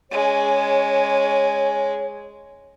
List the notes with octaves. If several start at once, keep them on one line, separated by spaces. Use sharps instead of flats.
G#3 C#4 C#5